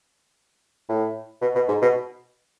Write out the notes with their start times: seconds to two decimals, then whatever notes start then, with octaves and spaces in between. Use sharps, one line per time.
0.89 A2
1.42 B2
1.55 B2
1.68 G#2
1.82 B2